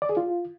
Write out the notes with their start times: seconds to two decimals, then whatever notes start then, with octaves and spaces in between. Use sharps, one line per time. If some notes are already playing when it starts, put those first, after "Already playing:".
0.02 D5
0.09 G#4
0.17 F4